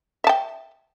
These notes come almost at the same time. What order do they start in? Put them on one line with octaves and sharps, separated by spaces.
E5 A5 G5